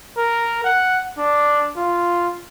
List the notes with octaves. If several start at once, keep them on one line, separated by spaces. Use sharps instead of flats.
A#4
F#5
D4
F4